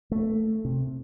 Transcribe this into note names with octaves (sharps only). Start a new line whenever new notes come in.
A3
C3